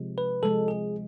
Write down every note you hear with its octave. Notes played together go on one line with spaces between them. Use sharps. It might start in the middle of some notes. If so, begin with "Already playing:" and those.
Already playing: C3 F3 G#3
B4
C3 F3 G#3 A4
G#4